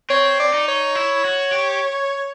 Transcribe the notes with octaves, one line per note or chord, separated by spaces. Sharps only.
C4 C#5
D5
D#4
C#5
E4
F#4
G4